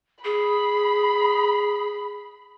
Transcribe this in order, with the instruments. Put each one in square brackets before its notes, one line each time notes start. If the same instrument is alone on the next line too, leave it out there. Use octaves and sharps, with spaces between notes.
[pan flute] G#4 [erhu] B5